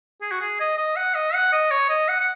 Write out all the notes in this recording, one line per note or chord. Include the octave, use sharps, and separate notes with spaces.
G#4
F#4
G#4
D#5
D#5
F#5
D#5
F#5
D#5
C#5
D#5
F#5
F#5